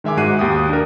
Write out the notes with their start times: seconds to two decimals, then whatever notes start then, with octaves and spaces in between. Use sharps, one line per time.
0.04 D#3 G#3 E5 G#5 D6
0.17 G#2 F#4 F#6 C7 D#7
0.39 D#2 G4 D#6
0.69 D4 A#4